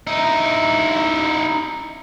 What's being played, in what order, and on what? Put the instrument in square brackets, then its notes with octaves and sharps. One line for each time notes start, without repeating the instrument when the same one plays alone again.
[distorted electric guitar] D#4 E4